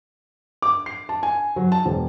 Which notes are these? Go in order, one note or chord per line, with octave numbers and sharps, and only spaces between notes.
D6
C7
A5
G#5
F#3
A5
E1